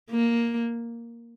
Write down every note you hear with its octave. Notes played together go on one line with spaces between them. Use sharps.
A#3